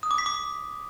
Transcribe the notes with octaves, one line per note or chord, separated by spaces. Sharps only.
D#6
D6
B6
D6